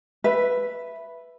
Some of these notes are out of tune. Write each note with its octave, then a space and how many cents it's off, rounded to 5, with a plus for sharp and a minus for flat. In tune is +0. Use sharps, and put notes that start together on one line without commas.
B4 +0 E5 +10